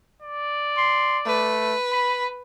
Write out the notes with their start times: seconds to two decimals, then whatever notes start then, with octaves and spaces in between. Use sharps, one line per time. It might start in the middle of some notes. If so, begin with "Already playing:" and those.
0.22 D5
0.77 C6
1.26 A3 B4
1.92 B5